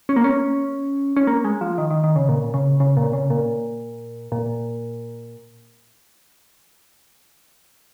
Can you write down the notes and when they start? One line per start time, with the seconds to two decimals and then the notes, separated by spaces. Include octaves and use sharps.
0.09 C#4
0.16 A#3
0.24 C#4
1.17 C#4
1.27 A#3
1.45 G#3
1.61 F3
1.78 D#3
1.91 D#3
2.04 D#3
2.16 C#3
2.29 A#2
2.54 C#3
2.80 C#3
2.97 A#2
3.13 C#3
3.30 A#2
4.32 A#2